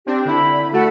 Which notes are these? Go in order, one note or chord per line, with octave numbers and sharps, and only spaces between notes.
C4 D4 G4
D3 E4 B5
A3 F#4 A4